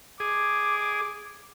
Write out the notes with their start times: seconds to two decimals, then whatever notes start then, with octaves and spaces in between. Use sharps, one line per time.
0.20 G#4 D6